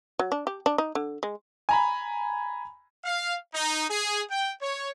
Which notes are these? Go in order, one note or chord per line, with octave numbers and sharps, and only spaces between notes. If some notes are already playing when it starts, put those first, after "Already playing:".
F#3
D4
G4
D4
D#4
D3
G#3
G#5 A#5 B5
F5
D#4
G#4
G5
C#5